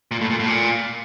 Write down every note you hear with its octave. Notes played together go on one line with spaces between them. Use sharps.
A#2
A2
A#2
A2
A#2